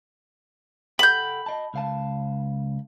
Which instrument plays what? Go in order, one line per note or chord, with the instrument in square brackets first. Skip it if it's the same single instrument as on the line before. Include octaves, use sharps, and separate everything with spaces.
[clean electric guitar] A4 F#5 G5 [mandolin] B5 G6
[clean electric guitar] D#5 A5
C#2 F5 A5